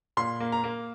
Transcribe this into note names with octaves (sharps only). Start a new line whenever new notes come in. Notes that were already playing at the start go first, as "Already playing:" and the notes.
A#2 C6
A#3
A#5
A#3